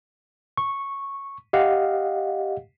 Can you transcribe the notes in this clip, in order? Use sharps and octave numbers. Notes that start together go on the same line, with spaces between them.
C#6
G4 D#5 F5 F#5